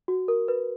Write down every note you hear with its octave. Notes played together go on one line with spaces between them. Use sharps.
F#4
A#4
B4